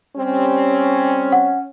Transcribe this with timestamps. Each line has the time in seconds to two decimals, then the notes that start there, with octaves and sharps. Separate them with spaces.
0.17 G3 C4 C#4
1.32 F#5